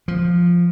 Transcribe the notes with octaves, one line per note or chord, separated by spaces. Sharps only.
F3